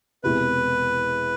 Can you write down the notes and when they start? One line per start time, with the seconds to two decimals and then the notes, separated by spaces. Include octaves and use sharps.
0.23 E1 E2 C3 B4